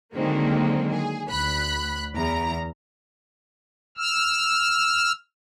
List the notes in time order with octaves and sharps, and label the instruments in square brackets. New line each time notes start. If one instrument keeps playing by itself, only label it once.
[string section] D3 D#3 F#3 G#3 A#3 C4
G#4
D2 B5 F#6
E2 A#5
[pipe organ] E6 F6